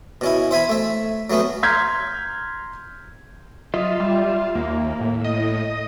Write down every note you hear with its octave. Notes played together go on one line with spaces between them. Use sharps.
B2 C#4 E4
C5 E5 G#5 B5
A3 E5
F#3 A3 B3 C#4
A#5 C6 F6 G6 G#6 B6
F#3 F4 D#5 E5
G3 E5
D#2 A#3
A2
D#5